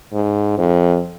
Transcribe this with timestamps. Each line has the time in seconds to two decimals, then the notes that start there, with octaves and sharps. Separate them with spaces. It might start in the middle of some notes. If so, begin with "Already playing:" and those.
0.13 G#2
0.58 F2